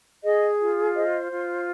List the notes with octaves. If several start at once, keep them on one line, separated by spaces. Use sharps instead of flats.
G#4 D#5
F4
C5 D#5
F4